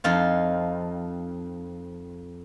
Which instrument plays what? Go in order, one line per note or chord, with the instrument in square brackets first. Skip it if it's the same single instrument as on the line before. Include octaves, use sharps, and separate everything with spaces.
[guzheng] F2 D#4 F4